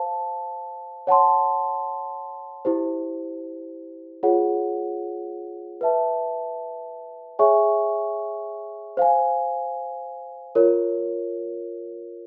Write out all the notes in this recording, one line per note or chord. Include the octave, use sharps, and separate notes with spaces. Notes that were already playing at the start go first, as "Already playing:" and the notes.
Already playing: C5 F5 A5
C#5 F#5 A5 C6
E4 G4 C5
F4 G#4 C#5 F#5
B4 E5 A5
G#4 C#5 E5 G#5 C#6
C5 F5 G#5
F4 A#4 C#5